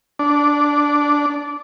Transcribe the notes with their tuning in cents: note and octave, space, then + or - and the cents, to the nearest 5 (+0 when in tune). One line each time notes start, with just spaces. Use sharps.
D4 -10